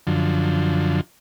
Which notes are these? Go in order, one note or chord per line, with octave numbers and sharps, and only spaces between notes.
F#2 D3 F3